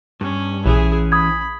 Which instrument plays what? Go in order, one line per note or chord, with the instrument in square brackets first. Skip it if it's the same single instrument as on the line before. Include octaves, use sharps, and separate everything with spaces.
[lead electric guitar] G2 [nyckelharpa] C#4
[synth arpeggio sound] A#1 [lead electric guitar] E3 C#4 [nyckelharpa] E4 G#4
[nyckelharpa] B5 [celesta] D#6 G#6